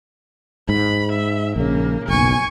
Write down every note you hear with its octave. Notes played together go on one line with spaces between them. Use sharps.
G#2 B5
E5
A#1 C#3 A#3
F#1 B1 G#5 C#6